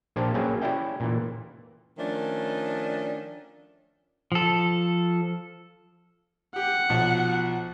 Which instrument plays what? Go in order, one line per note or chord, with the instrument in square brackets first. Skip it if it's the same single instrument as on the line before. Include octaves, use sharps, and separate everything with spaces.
[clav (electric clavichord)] A#1 A#3 D4 G4 C5 F5
F#3 A#3 C#4 G4 G#4 B4
C#4 E4 G4 D5 E5 G5
A#2 E3
[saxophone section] D#3 F3 A3 C#4 D4
[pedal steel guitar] F3 A4
[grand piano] G4 [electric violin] F#5
[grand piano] B1 F3